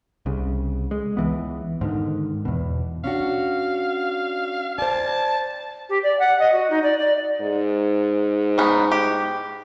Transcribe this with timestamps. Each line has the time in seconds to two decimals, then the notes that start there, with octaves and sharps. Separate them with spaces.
0.26 C2 C#3
0.91 G#3
1.17 C#2 E3 B3
1.81 G#2 D3 D#3
2.45 E2 B2
3.04 C#4 D4 F#4 F5
4.78 C5 D5 A5
5.89 G4
6.03 D5
6.19 F#5
6.39 D#5
6.52 F#4
6.69 D#4
6.82 D5
6.99 D5
7.41 G#2
8.58 B3 C#4 D#4
8.91 G4